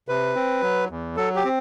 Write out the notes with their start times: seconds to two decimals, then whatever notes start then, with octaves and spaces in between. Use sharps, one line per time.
0.08 C3 B4
0.35 C4
0.62 F#3
0.90 E2
1.16 F#3 A4
1.36 G4
1.45 C4